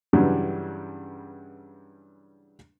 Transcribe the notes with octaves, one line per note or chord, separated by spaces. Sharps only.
G2 C#3 E3 F#3 G3